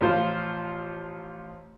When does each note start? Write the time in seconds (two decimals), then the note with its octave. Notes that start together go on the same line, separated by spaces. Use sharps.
0.01 A1 F3 F4 C5